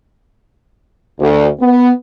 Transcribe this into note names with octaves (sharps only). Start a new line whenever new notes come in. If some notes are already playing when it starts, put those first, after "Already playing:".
D2
B3